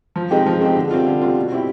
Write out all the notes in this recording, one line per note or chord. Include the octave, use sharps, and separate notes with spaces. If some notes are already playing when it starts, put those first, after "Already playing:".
F3
G#3 C4 D#4 G4
F3
G#3 C4 D#4 G4
D3
G3 C4 F4
D3
G3 C4 F4
B2
G3 C4 E4 G4